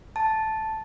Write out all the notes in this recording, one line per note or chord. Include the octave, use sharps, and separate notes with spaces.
A5